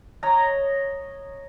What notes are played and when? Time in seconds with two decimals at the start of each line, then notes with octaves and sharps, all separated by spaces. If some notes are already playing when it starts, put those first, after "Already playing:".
0.23 C#5 D#5 A#5